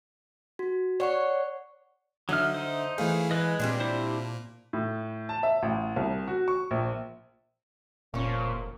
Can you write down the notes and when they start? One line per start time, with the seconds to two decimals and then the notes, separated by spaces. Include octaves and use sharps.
0.59 F#4
1.00 C#5 D5 F#5 C#6
2.29 D3 F#3 D#4 E5 F6
2.54 D#4 C5
2.98 E3 A3 G#4 F5
3.31 E3 G#3 B4 D#5
3.60 A#2 G3 C4 D4
3.80 E4 C5
4.73 A2
5.29 A5
5.43 E5
5.63 A1
5.96 C2
6.28 F#4
6.48 C#6
6.71 A#1
8.14 F1 A#2 F3 A#3 C#4 C#5